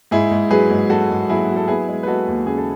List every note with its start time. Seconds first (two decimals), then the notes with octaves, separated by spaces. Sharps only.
0.11 G#2 E4 G#4
0.31 G#2
0.51 F#3 G#4 B4
0.70 G#2
0.90 F#3 F#4 A4
1.09 G#2
1.29 F#3 E4 G#4
1.49 F#3
1.56 A4
1.68 B3 E4 G#4
1.88 G#3
2.03 B4
2.07 G#3 F#4 A4
2.27 D#2
2.46 C#3 G#4
2.58 A4